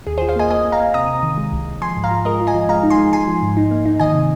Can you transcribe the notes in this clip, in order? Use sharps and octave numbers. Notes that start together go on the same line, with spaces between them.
D#2 G#4
G#4 C5
F4
C5 F5
A#3 D#5 G#5
A#3 D#5 G#5
A#3
F5 A#5
A#3
C3 A#5 D#6
C3
D#3
G#3
C2
C2
F3 G#5 C6
G#2
F5 A#5
F4
G#3 A#4 D#5
F4
D#5 G#5
F3
G#3 F5 A#5
D#4
G#5 C6
G#3
G#3 G#5 C6
F3
G#2
D#4
A#3
D#4
D#3 D#5 G#5
C3